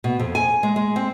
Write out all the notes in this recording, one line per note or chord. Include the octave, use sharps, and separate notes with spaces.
B2
F2
G#5
G#3
G#3
C4